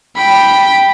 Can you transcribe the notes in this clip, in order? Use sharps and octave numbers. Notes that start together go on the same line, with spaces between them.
G5 B5